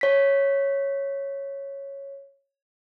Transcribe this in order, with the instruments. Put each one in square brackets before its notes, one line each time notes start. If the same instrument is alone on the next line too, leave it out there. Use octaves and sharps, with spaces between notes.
[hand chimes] C#5 B6